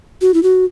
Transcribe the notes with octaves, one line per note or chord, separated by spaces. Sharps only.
F#4
E4
F#4